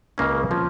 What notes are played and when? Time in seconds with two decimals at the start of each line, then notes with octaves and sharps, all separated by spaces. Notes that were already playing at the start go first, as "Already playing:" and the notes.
0.18 C#2 C#3 A#3 C#4
0.51 F3 C#4